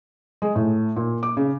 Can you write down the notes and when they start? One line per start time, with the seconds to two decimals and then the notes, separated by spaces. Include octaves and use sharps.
0.42 G#3
0.55 A2
0.96 A#2
1.23 D6
1.37 C#3